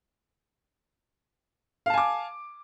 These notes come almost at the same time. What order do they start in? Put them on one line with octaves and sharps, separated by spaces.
F5 A5 G#5 D6